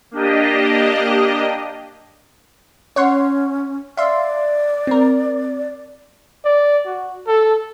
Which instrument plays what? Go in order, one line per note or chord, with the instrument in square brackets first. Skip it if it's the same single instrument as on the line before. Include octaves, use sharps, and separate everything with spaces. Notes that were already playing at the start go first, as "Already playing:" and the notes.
[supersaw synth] A#3 D4 G4 D#5
[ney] C#4 [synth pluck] C#5 F#5 C6
[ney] D5 [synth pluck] E5 F5 C6
[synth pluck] C4 A#4
[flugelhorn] D5
F#4
A4